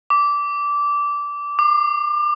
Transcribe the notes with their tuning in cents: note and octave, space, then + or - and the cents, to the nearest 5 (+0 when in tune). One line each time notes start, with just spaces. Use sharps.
D6 -15
D6 +30